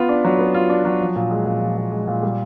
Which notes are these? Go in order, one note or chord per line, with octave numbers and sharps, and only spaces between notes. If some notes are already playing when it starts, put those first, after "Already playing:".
Already playing: B3 F4
D4
F#3
B3
F4
D4
F#3
F3
A#2
G#3
A#2
F3
A#2
G#3
A#2
G3